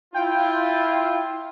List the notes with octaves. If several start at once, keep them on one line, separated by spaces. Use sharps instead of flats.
E4 F4 G5